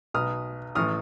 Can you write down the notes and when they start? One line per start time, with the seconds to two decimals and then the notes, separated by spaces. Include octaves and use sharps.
0.14 B1 B2 D#6 F6
0.75 A1 A2 E3 D#6 F6